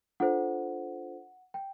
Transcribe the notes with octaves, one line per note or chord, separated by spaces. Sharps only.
D4 F4 A4 C5 F#5
G5